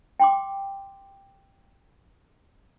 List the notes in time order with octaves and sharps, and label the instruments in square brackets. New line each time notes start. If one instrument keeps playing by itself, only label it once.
[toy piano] G5 C6 D6